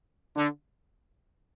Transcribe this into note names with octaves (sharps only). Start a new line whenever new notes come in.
D3